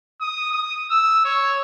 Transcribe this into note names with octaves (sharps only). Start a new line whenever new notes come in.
D#6
D#6
E6
C#5